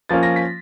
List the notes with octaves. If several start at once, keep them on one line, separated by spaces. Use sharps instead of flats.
F3 A#3 C#4 F4 A6
A#6
B6